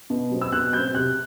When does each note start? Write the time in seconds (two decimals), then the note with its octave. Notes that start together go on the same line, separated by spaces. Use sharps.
0.10 B2
0.31 F#3 C4
0.41 E6
0.52 B2 F#6
0.73 F#3 G6
0.78 C4
0.94 C3 F#6